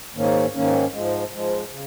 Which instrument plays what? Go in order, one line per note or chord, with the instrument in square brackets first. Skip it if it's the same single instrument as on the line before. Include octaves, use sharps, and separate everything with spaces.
[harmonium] G#2 D#3 A#3 C#4
G#2 D#3 A#3 C#4
G#2 F3 G#3
G#2 F3 G#3
C#3